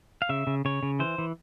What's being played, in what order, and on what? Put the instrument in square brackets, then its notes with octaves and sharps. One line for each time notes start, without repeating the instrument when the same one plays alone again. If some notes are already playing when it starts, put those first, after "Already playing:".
[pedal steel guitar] F5
C#3 E5
C#3
C#3 C#5
C#3
E3 C5
E3